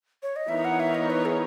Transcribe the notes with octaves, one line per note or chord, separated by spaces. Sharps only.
C#5
D#5
E3 B3 D#4 A#4 C#5 E5
F#5
E5
D#5
B4
G#4